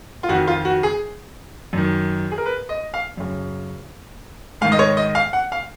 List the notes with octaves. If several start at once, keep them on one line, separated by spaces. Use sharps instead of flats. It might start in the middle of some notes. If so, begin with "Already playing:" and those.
F4
F2 D#3 F#4
F4
F#4
G#4
F#2 D#3
G#4
A#4
B4
D#5
F5
F#2 C#3
G#2 D#3 F5
D#5
C#5
D#5
F5
F#5
F5